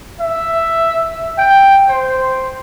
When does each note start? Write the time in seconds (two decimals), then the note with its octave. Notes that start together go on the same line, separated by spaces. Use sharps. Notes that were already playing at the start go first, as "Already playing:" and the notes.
0.20 E5
1.38 G5
1.88 C5